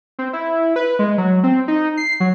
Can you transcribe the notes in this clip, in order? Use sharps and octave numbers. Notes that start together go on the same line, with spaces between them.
C4
E4
B4
G#3
F#3
C4
D#4
C7
F#3